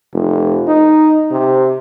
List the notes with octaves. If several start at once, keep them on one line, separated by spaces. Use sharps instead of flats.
F1
D#4
C3